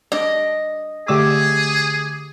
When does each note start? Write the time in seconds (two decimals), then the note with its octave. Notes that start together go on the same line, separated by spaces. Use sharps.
0.12 D4 D5 D#5
1.08 D3 A3 G4 G#4 D5 D6 E6